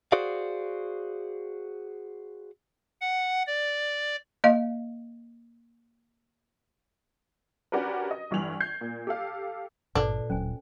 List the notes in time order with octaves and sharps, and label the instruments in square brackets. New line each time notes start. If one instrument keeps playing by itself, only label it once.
[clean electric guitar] F#4 G#4 C5 D5 F5
[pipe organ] F#5
D5
[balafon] A#3 D#5 F5
[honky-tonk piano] C#4 D4 F#4 G4 A#4 B4
D#5
G1 G2 E3 F7 F#7
G6 G#6 C7
A#2
G4 A4 F5
[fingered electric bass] G#1 G2 [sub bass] A#2 [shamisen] D4 [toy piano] A4 B4 D5
[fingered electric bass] D1 F#3 [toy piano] C#4 C5 G#5